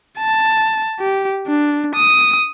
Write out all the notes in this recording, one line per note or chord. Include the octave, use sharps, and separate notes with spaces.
A5
G4
D4
D#6